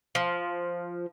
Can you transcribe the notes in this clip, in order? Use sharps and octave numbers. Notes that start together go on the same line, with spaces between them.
F3